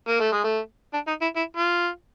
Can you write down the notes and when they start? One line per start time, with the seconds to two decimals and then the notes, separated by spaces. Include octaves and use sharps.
0.08 A#3
0.20 A3
0.32 G#3
0.44 A3
0.93 D4
1.07 D#4
1.21 E4
1.36 E4
1.56 F4